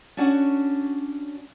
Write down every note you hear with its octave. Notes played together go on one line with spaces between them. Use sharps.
C#4 D4 F#4 F#5